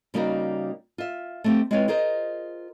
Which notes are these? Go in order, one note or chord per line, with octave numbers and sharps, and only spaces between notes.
C#3 G3 A#3 D#4 F#4 A#4
F4 E5
A3 C4 G4
G#3 C4 E4 F4 B4 C#5
F4 G#4 A#4 C5 D#5